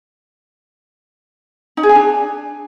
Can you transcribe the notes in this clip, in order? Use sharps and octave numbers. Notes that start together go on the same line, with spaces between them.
D#4
G#4
G#5
D4